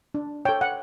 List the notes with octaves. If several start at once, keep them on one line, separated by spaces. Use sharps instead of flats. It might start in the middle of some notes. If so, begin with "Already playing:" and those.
D4
A4 C#5 G5
F#5